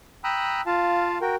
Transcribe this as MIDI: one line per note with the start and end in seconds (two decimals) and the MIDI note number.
0.24 0.61 79
0.24 0.61 82
0.24 0.61 83
0.24 0.61 87
0.24 0.61 88
0.24 0.61 90
0.66 1.18 65
0.66 1.18 77
0.66 1.18 81
1.21 1.36 66
1.21 1.36 70
1.21 1.36 79